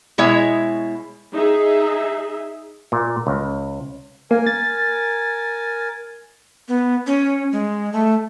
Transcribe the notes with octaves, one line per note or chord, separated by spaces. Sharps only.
B2 G#3 E4 C#5 E5
D#4 G#4 E5
A#2
C#2
A#3 A#4 G#5
A6
B3
C#4
G#3
A3